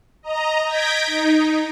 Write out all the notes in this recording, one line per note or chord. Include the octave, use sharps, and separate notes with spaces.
D#5 A#5
G6 G#6 A#6 B6 D7
D#4